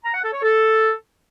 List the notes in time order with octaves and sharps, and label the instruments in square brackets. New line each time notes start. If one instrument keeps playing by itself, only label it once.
[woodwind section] A#5
F#5
A4
C#5
A4